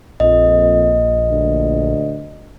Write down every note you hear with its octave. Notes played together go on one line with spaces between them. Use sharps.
A#1 F2 D#5
D2